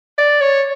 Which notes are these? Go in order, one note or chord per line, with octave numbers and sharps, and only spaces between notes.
D5
C#5